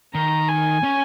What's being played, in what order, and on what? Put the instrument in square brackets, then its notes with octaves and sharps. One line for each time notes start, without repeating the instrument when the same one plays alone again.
[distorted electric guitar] D#3 [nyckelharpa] A#5
[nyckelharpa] G#5
[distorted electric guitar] C#4